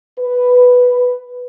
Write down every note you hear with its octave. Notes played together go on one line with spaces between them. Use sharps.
B4